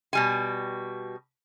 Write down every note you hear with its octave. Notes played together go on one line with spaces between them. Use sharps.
B2 G3 G#5